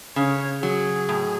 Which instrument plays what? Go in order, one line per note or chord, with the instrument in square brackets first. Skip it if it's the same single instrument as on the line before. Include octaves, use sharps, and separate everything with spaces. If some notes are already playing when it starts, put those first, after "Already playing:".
[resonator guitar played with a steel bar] C#3 [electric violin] C#5
[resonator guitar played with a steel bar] F#3 [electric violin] G#4
[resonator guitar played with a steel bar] A2